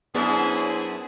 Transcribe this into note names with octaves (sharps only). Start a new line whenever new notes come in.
F#2 B3 C4 D4 E4 G#4